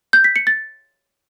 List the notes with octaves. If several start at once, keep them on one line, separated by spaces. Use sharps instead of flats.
G6
B6
C#7
A6